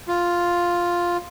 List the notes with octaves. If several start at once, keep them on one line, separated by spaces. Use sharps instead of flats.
F4